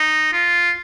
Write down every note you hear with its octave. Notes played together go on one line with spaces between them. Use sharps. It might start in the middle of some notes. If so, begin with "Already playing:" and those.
Already playing: D#4
F4